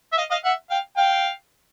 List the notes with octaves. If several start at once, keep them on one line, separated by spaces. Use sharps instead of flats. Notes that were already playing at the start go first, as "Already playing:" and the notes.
E5
D#5 F5
D#5 F5
E5 F#5
F5 G5
F5 G5